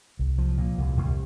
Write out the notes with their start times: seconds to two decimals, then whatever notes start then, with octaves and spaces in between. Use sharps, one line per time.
0.19 C2
0.38 F3
0.58 A#2
0.78 C2
0.97 C2